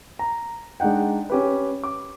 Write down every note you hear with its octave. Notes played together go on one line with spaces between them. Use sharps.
A#5
G#3 D4 D#4 F#5 G5
C#4 G4 B4
D6